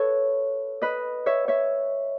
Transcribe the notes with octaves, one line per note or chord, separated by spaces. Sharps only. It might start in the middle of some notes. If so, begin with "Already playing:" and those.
Already playing: A4 B4 C#5
B4 D#5
C#5 E5
C#5 E5